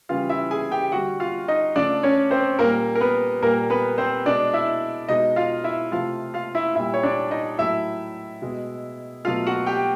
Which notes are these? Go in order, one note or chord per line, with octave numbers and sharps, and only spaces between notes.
C#3 E3 G3 F4 F5
E4 E5
G#4 G#5
G4 G5
D3 G3 F#4 F#5
F4 F5
D#4 D#5
C#3 F3 A3 D4 D5
C#4 C#5
C4 C5
A#2 G3 A#3 A#4
A#4
B3 B4
A#2 G3 A#3 A#4
B3 B4
C4 C5
B2 G#3 D4 D5
E4 E5
B2 G#3 D#4 D#5
F4 F5
E4 E5
C3 F3 A3 F4 F5
F4 F5
E4 E5
A#2 G3 E4 E5
C#5
D4 D5
D#4 D#5
A2 F#3 A3 E4 E5
B2 G#3
B2 F#3 A3 F4 F5
F#4 F#5
G4 G5